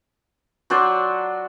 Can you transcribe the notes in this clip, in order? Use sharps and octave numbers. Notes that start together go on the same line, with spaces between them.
F#3 D4 C5 D5